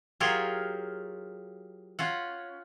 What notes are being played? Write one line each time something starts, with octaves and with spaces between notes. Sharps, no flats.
F#3 F4 G4 G#4 A#4 C#5
C#4 F4 F#5